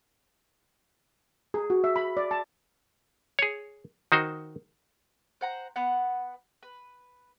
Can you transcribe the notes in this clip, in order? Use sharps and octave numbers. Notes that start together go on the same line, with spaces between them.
G#4
F#4
E5
B5
D5
A5
G#4 C#5
D#3 D#4 F#4 C5
C5 F#5 A#5
B3 F#5
B4